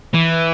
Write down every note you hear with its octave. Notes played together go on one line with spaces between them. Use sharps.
E3